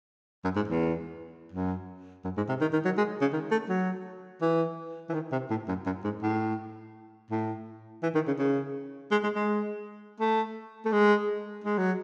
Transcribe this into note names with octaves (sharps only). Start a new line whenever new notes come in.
F#2
G#2
E2
F#2
F#2
G#2
C3
D#3
D#3
F#3
G#3
C#3
D#3
A3
F#3
E3
E3
D#3
C3
A2
F#2
F#2
G#2
A2
A2
E3
D#3
C#3
C#3
G#3
G#3
G#3
A3
A3
G#3
G#3
F#3